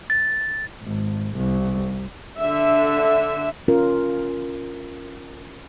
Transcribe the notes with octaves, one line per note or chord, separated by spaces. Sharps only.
A6
G#1
C2
D3 E5
C#4 F4 A#4